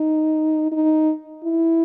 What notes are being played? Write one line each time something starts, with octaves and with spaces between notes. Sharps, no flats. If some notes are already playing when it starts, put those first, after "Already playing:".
Already playing: D#4
D#4
E4